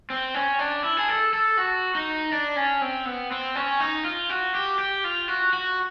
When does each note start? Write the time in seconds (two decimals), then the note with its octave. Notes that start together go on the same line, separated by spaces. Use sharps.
0.10 C4
0.34 C#4
0.59 D4
0.84 E4
0.97 G#4
1.08 A4
1.33 A4
1.57 F#4
1.95 D#4
2.32 D4
2.56 C#4
2.81 C4
3.05 B3
3.31 C4
3.55 C#4
3.80 D#4
4.05 F4
4.30 F#4
4.55 G4
4.79 G4
5.04 F4
5.28 F#4
5.53 F#4